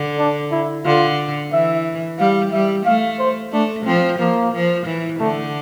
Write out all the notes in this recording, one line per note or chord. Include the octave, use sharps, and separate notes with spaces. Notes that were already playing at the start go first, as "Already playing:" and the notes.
Already playing: D3
D4
E4
D3 F4
E3 E5
G3 F5
G3 E5
A3 F5
C5
A3 D4
F3 C4
F3 A#3
F3
E3
D3 A3